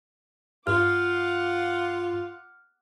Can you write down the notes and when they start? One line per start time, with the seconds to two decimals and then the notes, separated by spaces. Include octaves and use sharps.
0.67 G2 F4 F#5 D6 F6